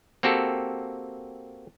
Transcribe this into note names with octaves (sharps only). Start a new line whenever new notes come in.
A#3 C4 F#4 G4 A4